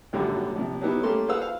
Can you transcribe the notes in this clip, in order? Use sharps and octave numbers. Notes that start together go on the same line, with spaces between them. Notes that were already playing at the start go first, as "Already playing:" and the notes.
G#1 F#2 A#2 D3 F#3 G3
A#1 C3
F#3 G3 A#3 B3 D#4 E4
A3 A#3 C#4 G4 A4 C6
G#4 B4 C5 F5 F#5 E6
F5